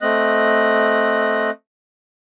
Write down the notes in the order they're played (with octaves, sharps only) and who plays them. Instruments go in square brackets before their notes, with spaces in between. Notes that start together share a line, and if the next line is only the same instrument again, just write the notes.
[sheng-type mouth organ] A3 C4 D#5 F#6